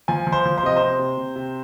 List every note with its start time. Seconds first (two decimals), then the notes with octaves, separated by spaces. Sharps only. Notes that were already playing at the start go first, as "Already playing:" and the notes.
0.08 F3 G#5
0.27 F3
0.32 C5
0.46 F3
0.58 C5
0.63 C3 D#5
0.76 C5
0.82 C3
0.99 C3
1.17 C3
1.36 C3